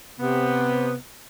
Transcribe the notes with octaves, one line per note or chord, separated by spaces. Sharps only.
C3 B3